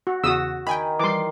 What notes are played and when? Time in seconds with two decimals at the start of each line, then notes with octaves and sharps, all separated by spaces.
0.07 F#4
0.24 E2 C#3 F#4 D#6 E6 E7
0.67 D#3 G5 G#5 B5
0.99 E3 G3 C6 D6